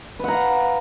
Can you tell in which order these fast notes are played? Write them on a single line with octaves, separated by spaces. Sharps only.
B4 F#5 A#5 F5